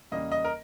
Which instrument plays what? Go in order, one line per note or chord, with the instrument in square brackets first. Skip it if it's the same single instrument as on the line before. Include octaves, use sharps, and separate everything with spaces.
[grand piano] E2 C#3 G3 A#3 D#5
D#5
A#4